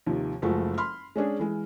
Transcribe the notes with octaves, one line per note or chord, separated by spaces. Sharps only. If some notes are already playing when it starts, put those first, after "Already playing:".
D#2 C3 D#3 F3
F#1 F3 G#3 A3 F#4
B5 C6 F6
G#3 C#4 D4 G#4
E3 G#3